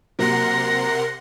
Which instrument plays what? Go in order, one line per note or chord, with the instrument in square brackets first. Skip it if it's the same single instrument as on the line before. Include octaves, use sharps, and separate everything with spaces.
[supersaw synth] C3 F#5 C6 [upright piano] F#3 A#3 [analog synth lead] A#4 [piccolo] A#6